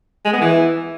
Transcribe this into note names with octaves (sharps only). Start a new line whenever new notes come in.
G#3
B3
E3